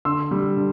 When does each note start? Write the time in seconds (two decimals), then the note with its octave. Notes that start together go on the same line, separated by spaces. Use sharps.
0.05 D3 C6 E6
0.31 G3
0.57 D3